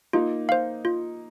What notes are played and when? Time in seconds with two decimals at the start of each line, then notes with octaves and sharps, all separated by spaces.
0.13 A#3 D#4 F4
0.49 C5 F5
0.85 F4